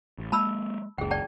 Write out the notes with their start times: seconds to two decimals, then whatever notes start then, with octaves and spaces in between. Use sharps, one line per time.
0.18 A1
0.32 G#3 A#3 A5 B5 E6
0.98 F#1 C#2 G#4 G5
1.11 D5 G5 A5